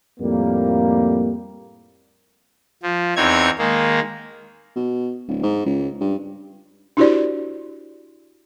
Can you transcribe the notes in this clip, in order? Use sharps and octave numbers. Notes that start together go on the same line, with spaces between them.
F2 A2 G3 A#3
F3
E2 C4 D#4 C#5 G#6
D#3 G#3 A#3
B2
D1
G#2
C#2
G2
D4 E4 F#4 G4 C5 D5